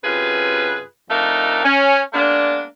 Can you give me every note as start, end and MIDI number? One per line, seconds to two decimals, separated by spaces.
0.04 0.82 42
0.04 0.82 48
0.04 0.82 65
0.04 0.82 68
0.04 0.82 71
1.10 1.61 41
1.10 1.61 57
1.10 1.61 62
1.10 1.61 63
1.10 1.61 70
1.10 1.61 77
1.64 2.00 61
2.13 2.64 56
2.13 2.64 58
2.13 2.64 59
2.13 2.64 62